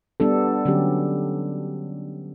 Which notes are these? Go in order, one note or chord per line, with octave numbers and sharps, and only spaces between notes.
G3 B3 D4 A4
D3 F#3 C#4 G4